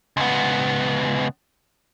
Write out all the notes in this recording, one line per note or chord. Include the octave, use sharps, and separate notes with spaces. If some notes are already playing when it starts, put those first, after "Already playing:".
C#2 B3